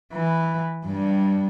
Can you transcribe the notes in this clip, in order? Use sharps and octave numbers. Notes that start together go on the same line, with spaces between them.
E3
G2 G3